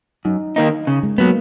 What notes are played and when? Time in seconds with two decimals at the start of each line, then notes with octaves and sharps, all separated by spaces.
0.25 F#2 D#4
0.56 D#3 A#3 D#4
0.87 C#3
1.03 G#3
1.18 F#3 A#3 B3